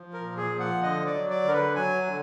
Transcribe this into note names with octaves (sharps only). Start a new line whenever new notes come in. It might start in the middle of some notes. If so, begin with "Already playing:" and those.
Already playing: F3
A#4
A#2
G#4
F3
F#5
D3 D#5
D5
F#3
D5
D3 A#4
B4
F#3 G#5
D3